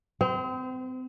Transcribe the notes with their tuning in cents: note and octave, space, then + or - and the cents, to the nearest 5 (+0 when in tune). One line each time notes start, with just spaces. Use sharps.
C4 -35 C5 -10